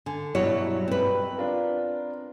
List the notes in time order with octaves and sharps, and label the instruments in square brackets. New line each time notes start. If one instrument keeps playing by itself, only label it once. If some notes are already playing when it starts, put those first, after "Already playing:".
[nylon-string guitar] D3 [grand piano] G#5
[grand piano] G1 B2 G3 [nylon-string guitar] F#3 E4 C#5
[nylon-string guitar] C4 B4
[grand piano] D4 F4 A#4